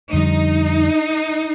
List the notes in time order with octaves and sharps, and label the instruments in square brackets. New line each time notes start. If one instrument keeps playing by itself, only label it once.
[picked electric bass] F2 D3 G3 [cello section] D#4